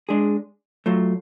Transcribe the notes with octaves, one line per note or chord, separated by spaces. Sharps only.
G#3 D4 G#4
F#3 A3 F4